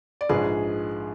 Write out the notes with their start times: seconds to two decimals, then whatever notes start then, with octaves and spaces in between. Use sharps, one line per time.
0.21 D5
0.29 A#1 G#2 F3 G#3 G#4 B4